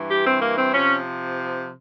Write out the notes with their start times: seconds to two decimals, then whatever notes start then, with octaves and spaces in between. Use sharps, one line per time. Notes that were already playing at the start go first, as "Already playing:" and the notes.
Already playing: G2 E3
0.10 G4
0.25 C4
0.41 A#3
0.58 C4
0.74 C3 F3 C#4